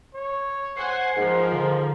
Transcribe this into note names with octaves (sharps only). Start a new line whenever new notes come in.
C#5
C5 F#5 G#5 C7
G#2 F3 A#4
D3